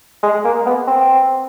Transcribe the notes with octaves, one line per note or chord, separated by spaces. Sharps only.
G#3
A#3
B3
C4